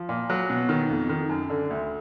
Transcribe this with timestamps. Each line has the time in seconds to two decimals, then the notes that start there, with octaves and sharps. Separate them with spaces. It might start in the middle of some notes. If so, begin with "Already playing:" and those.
Already playing: F3
0.09 A#2
0.30 F#3
0.50 B2
0.69 D#3
0.89 F2
1.09 D#3
1.30 F#2
1.50 D3
1.70 D2